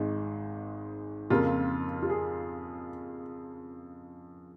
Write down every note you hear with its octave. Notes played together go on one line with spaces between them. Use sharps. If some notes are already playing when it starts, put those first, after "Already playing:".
Already playing: G#1 G#2 G#3
F2 C#3 A#3 F4
F4
G#4